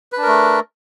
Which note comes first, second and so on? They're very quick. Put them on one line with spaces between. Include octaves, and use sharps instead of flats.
B4 D4 A#4 A3